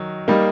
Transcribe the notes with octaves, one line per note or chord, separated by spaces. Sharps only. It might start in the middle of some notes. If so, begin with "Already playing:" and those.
Already playing: D#3 F#3 D#4
G3 A#3 D#4